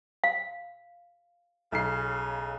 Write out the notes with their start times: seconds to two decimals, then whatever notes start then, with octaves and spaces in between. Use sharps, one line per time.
0.24 F5
1.72 B1 C#3 C7